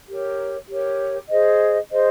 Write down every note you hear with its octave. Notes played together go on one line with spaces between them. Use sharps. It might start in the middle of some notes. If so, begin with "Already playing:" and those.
G4 A#4 C#5
G4 A#4 C#5
G#4 C5 D#5
G#4 C5 D#5